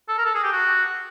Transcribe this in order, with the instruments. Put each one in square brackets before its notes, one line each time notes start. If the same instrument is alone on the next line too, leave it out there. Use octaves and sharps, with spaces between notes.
[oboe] A4
A#4
A4
G#4
G4
F#4